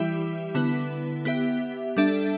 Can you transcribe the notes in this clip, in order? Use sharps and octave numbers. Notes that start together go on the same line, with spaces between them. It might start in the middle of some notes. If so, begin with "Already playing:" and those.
Already playing: E3 G3 E4 G4 E5
D3 B3 E4 B4
B3 G4 E5
G3 D4 A4 E5